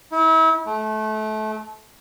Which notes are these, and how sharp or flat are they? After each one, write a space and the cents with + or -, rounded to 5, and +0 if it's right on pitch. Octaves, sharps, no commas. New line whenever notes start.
E4 -35
A3 -25